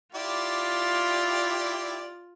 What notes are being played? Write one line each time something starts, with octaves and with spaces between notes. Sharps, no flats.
E4 F4 G4 D5